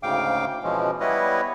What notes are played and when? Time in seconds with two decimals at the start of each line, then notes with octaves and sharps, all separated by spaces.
0.03 D2 G#2 C#3 F5 G5 D6
0.63 B2 E3 F3 G#3 C#4
1.00 G3 B3 E4 B4 C#5 D#5